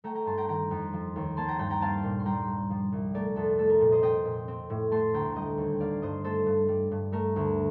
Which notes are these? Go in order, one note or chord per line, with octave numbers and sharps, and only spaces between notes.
A3 G5 A#5
G5 A#5
G2 A5 C6
G5 A#5
D#3 G5 A#5
F2
F3
D#2
A#3 A5 C6
G5 A#5
G2 G5 A#5
G5 A#5
C4 F5 A5
A#2
C6
G3 G5 A#5
G2
F3
C2
A3 A#4 D5
F2 A4
A3 A4
A#4
A#2
C5 D#5
C4 D#5 G5
A#2
C4
A2
A3 A5 C6
D2 G5 A#5
G3 D#5 G5
D#2
A#3 D5 F5
G2 C5 D#5
A3 A4 C5
G2
G3
G2
A3 A#4
D2